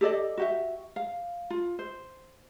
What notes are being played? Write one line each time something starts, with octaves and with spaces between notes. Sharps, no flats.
G4 A4 D5 D#5
F#4 G4 E5
F5
F4
C5